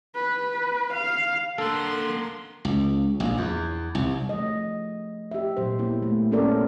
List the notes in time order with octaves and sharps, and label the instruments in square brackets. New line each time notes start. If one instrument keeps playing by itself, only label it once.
[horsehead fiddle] B4
F5
[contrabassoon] D3 [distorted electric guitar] A#3 F#5 [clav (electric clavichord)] A4 [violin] A#4 C6
[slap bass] C#2
A#1
E2
C2
[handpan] F3 A3 D#5
G4 E5
A#2 F#3 C5
A#3 B3 E4
A3
A#3 B3 C#4 A4 A#4 D5